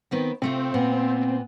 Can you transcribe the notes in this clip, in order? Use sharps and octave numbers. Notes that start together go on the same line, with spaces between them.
D#3 B3 C4
C3 A3 C4 F4
A#2 B3